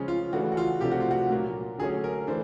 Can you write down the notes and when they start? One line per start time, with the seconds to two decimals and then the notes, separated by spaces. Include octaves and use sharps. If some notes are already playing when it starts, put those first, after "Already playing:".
Already playing: C#3 F3 G#3 C#4
0.08 F4
0.33 C#3 E3 A3 D4 F#4
0.52 F#4
0.57 F4
0.81 C3 F3 A3 D4 G4
0.92 F#4
1.00 F4
1.11 F#4
1.30 A#2 F#3 A#3
1.78 D3 F#3 A3 C#4 G#4
2.04 A#4
2.27 E3 A3 D4 C5